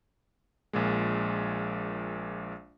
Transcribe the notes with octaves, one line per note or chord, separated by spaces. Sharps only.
A#1 A#2 G#3